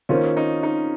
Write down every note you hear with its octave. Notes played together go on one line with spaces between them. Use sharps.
D#3 A#3 C#4 F4 C5
D#4
D#4